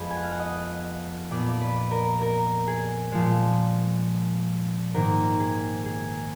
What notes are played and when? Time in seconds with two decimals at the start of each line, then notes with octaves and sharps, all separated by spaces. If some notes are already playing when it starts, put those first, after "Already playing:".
Already playing: F2 F3 G#3 B3 G#4 B4
0.10 G#5
0.16 F#5
0.23 F5
0.32 F#5
0.40 D#5
1.31 A#2 F3 B3 D5
1.52 D5
1.61 B4
1.91 A#4
2.21 A#4
2.67 G#4
3.12 A#2 F3 G#3
4.94 G#2 D#3 A#3 A#4
5.40 G#4
5.86 G#4